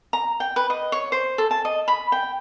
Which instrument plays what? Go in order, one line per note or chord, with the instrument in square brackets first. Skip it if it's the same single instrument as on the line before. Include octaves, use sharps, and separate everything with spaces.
[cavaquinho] A#5
G5
B4
D#5
C#5
C5
A4
A5
D#5
B5
G5